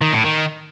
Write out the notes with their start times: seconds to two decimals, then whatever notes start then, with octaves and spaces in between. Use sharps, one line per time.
0.01 D#3
0.13 A2
0.24 D#3